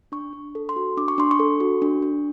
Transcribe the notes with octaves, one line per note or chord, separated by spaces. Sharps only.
D4 C#6
D4
A4
C6
F#4
D4 D6
C#6
D4 C6
C#6
A4
F#4
D4
D4